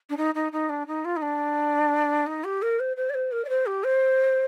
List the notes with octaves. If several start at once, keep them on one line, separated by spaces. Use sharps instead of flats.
D4
D#4
D#4
D#4
D4
D#4
F4
D#4
D4
D#4
G4
A#4
C5
C5
D5
C5
A#4
D5
C5
G4
C5